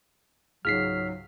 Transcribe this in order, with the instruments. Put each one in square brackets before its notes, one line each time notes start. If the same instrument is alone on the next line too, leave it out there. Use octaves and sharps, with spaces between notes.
[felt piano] C#2 G#2 [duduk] F#3 [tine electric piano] F6 B6 C7